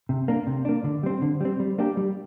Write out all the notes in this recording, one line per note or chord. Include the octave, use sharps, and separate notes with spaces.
C3
A#3 D4
C3
A#3 D4
D3
G3 C4
D3
G3 C4
G3
A#3 D4 G4
G3